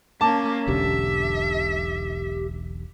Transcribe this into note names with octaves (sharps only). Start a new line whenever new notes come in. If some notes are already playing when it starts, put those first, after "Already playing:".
A#3 C#4 A5 D6
E1 B1 D3 G4 E5